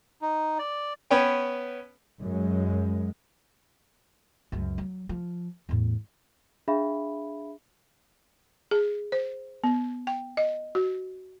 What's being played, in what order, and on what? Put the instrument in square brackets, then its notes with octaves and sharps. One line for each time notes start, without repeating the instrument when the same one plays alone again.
[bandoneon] D#4
D5
[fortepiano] B3 C#4 B4 C#5 G5
[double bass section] F#2 G#3
[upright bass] C#2 F#2
F#3
F3
E2 A2
[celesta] D4 G#4 E5 F5 B5
[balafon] G#4
C5
B3
G5
D#5
F#4